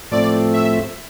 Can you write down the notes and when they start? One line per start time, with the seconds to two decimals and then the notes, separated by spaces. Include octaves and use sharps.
0.11 A2 F3 A3 C4 D5
0.54 E5